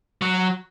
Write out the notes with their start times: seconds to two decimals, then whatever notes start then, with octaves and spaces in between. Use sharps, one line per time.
0.22 F#3